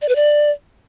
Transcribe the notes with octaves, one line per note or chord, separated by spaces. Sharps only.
D5
B4
D5